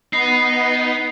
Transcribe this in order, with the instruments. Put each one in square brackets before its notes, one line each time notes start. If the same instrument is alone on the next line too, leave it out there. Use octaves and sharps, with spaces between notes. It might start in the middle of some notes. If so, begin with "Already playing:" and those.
[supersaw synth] B3 [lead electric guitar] D#4 [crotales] C7